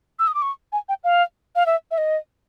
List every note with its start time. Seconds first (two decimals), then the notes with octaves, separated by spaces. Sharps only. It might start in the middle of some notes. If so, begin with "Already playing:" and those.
0.19 E6
0.27 D#6
0.35 D6
0.42 C#6
0.72 G#5
0.89 G5
1.04 F5
1.56 F5
1.66 E5
1.91 E5
1.98 D#5